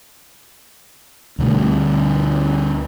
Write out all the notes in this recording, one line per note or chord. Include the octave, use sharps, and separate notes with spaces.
D2 B2 G3 A3